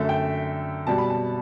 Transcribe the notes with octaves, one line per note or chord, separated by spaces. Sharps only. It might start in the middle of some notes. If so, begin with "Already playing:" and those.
Already playing: F#2 D3 A3 E5
G5
B2 G3 A5
B5
A5